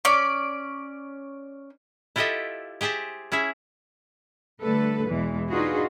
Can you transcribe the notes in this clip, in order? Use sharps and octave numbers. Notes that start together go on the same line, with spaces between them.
C#4 D5
E4 F4 G4 A4 D#5 E5
G4 G#4 C5 E5 A5
C#4 E4 G#4 E5
D3 G3 A3 A4 B4
E2 B2 E3 G#3
D4 D#4 F4 F#4 G#4 B4